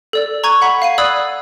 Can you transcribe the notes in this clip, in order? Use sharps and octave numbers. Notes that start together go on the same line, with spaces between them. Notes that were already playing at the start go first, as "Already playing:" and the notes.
A4 D5 E6
A#5 C#6 F#6 G#6 D#7
F#5 B5 B6
F5 C7 D#7
D5 B5 D#6 E6 F#6 G#6